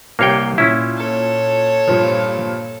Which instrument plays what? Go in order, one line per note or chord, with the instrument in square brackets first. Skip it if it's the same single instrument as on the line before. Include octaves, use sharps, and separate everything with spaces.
[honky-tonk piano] C2 C3 C7 [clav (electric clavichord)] A#3 C#5 G5
[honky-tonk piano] A#2 [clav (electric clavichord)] C#4 E4
[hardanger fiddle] A4 C#5
[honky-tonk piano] G2 A#2 F3